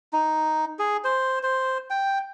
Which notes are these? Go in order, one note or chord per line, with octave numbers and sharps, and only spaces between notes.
D#4
G#4
C5
C5
G5